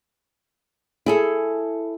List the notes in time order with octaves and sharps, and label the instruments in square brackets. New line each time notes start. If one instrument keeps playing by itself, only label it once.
[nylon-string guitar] E4 G#4 A4